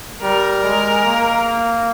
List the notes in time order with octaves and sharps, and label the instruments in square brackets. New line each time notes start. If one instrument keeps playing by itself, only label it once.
[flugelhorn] G3 [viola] A#4
[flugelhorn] G#3
A#3